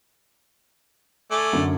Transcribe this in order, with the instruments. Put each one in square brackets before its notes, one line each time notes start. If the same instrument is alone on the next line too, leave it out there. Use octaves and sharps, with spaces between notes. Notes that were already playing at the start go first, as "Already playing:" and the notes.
[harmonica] A3 D5 G#5
[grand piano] F#2 D3